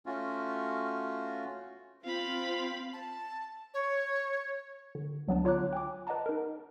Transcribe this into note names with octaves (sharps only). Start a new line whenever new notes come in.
A3 C#4 F4 F#4
C4 F4 F5 B5
A5
C#5
D3
C#2 F#3 B3 D4 A5
D3 F4 C#5 A#5 D6 F#6
G5 G#5 D6
B4 D#5 F#5 A5 A#5
D#4 A#4